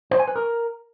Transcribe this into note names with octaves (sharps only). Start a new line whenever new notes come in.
C5
G#5
B4
A#4